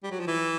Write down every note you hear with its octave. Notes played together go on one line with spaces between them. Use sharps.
G3
F#3
F3
E3